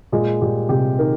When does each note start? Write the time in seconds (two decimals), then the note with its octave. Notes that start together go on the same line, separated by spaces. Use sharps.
0.12 A#2 G#3
0.41 A#2 G4
0.69 C3 G4
0.99 D#3 A#4